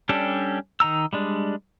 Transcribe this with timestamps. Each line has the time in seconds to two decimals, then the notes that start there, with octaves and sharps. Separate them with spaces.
0.09 G3 C#4 D4 G4 A4
0.80 D#3 D#4 A#5 E6
1.13 G3 G#3 D4